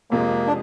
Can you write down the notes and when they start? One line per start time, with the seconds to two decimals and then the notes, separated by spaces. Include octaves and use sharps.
0.11 F2 C3 F3 G#3 A#3
0.47 D4